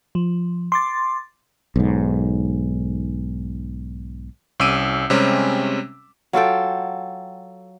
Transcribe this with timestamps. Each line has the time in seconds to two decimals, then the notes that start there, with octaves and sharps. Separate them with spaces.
0.15 F3
0.72 C6 D6 A6
1.76 B1 G#2
4.60 C2 C#4 D6 E6 D7 D#7
5.10 C3 G3 G#3 C4 C#4
6.33 F#3 F4 A4 G5